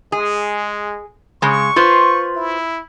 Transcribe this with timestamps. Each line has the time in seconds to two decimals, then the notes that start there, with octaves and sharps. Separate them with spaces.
0.12 G#3 G#4
1.42 C#3 G#3 C#6
1.76 F4 B4 C5
2.36 E4